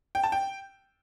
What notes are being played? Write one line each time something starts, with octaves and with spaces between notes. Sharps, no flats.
G5
A5
G5